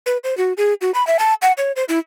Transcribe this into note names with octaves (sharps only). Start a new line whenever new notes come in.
B4
C5
F#4
G#4
F#4
B5
E5
A5
F#5
C#5
C5
E4